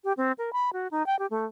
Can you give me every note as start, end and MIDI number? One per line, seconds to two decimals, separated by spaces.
0.04 0.13 67
0.17 0.32 60
0.38 0.53 70
0.53 0.73 83
0.73 0.88 66
0.91 1.05 63
1.06 1.18 79
1.19 1.26 67
1.30 1.46 57